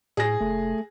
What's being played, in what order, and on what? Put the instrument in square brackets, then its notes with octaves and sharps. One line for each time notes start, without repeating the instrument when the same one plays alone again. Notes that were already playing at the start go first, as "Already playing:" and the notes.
[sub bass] A2 [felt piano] G#4 A#6
[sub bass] F1 [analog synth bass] A3